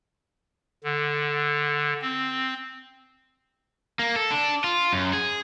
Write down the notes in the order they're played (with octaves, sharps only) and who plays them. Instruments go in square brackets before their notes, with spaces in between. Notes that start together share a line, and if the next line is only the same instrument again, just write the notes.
[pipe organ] D3
C4
[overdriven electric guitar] A#3
A4
D4
F4
F#2
G#4